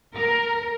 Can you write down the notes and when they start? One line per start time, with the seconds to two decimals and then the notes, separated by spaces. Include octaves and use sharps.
0.15 A#4